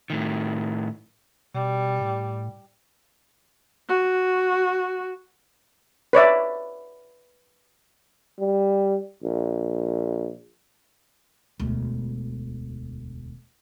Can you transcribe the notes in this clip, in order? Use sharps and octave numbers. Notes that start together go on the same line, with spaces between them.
A2 D#3
B2 G3
A2
F#4
B4 C#5 D5 E5
G3
A#1
E1 D2